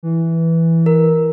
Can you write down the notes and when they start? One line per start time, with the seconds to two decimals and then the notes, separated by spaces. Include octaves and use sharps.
0.03 E3
0.86 A#4